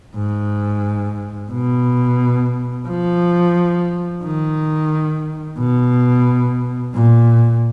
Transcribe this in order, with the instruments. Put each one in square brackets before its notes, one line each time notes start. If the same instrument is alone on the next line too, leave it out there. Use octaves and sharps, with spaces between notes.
[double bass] G#2
B2
F3
D#3
B2
A#2